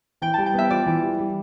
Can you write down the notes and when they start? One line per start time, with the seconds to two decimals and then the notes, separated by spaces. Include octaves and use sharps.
0.22 E3 G5
0.34 G3 A5
0.46 G5
0.54 B3 E5
0.70 F4 D5
0.86 E3
1.03 G3
1.19 G3